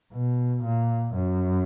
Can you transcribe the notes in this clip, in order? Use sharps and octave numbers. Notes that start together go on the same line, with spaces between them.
B2
A#2
F#2